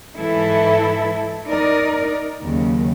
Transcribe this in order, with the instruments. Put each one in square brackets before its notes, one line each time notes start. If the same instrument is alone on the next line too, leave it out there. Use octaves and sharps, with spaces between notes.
[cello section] G#2 E3 E4 A4
D#4 A#4 D5
D#2 C#3 F#3